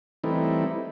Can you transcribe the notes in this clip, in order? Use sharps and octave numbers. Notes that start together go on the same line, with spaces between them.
E3 G3 A3 C4 D#4 E4